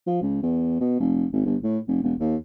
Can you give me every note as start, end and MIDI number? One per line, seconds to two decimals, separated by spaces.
0.07 0.20 53
0.22 0.39 37
0.43 0.77 40
0.80 1.00 47
1.00 1.25 29
1.33 1.44 32
1.46 1.56 31
1.63 1.78 45
1.88 2.03 29
2.03 2.14 28
2.20 2.36 39